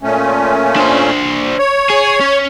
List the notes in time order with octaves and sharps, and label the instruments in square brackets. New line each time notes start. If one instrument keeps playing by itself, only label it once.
[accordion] A#2 A3 C#4
[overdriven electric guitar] D4 C5
[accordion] C#5
[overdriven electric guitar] G#4
C#4